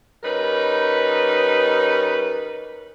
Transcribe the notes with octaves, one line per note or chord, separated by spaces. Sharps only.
G3 C#4 D#4 A#4 B4